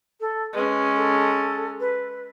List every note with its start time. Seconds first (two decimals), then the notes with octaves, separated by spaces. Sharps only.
0.20 A4
0.53 G#3 C#4 B4
0.95 A4
1.80 B4